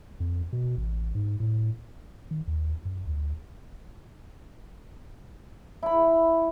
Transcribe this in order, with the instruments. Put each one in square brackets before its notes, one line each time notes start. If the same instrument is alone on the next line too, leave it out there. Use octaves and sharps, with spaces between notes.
[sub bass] F2
B2
A1
G#2
A2
D#3
D#2
F#2
D2
[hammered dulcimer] E4 B5